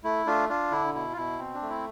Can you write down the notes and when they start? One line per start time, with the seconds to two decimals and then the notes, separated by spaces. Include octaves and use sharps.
0.04 A3 E4
0.26 A3 D4 F4
0.49 D4 F4
0.71 D3 E4
0.94 B2 E4
1.13 F4
1.17 B2 E4
1.39 C4
1.54 D4
1.62 A3
1.69 E4